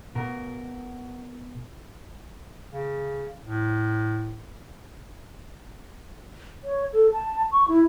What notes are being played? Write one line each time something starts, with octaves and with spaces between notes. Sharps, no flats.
B2 A#4
C#3
A2
C#5
A4
A5
C#6
E4